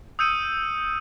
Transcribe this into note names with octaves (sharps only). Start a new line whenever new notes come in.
D#6 E6 G6 C#7 D#7